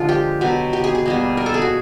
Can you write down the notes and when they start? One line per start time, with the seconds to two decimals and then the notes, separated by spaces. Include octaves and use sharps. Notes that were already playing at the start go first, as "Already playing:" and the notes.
Already playing: D3 F3 G#3 F4
0.09 G4
0.41 B2 F#3 B3
0.73 G4
0.84 G#4
0.95 G#4
1.06 B2 G3 A#3
1.37 A#4
1.46 A4
1.54 G#4
1.62 F#4